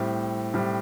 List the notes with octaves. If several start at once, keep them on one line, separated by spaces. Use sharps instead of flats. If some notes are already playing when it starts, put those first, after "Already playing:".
Already playing: A2 G3 C4
A2 G3 C4